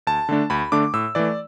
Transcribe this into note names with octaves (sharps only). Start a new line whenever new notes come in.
D2 A5
D3 A3 D4
D2 B5
D3 A3 D4 D6
A2 E6
E3 A3 D5